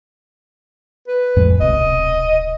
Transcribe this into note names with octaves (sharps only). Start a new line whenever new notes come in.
B4
F2 A2 G#3
D1 B1 C3 D#5